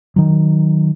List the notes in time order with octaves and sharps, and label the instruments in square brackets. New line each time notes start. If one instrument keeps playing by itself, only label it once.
[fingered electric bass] D#3 F#3